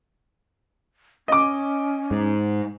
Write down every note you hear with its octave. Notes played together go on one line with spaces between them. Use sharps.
C#4 D#5 D6
G#2